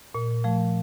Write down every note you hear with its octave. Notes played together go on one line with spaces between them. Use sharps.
A#2
F3 A3